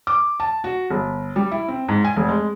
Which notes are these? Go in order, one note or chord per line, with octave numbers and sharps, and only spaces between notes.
D6
A5
F#4
G1
G3
E4
C4
G#2
G#5
F1
G#3